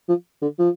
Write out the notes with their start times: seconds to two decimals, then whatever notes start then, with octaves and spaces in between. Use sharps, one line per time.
0.09 F3
0.42 D3
0.59 F3